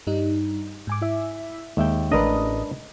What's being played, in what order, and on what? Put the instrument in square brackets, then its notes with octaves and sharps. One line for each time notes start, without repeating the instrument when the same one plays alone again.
[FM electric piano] G2 G3 D#4
G#2 G#5 D6
E4 E5
[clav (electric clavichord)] D#2 E5 G5 [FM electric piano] G#3
[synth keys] A1 D#5 [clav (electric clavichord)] D4 A#4 B4